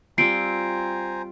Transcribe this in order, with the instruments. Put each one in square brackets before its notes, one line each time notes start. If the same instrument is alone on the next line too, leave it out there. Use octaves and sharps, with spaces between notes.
[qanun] G3 C4 F4 [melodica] C5 G#5 A#5 [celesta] C7 D7